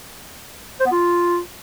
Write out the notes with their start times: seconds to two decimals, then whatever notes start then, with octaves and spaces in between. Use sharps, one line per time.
0.80 C5
0.86 B3
0.92 F4